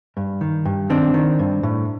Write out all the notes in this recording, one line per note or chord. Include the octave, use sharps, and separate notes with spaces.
G2
D#3
G2
D#3 C4 D4
D#3
G2
A2